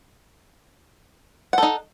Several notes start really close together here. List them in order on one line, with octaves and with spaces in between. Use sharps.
F#5 A4 D#4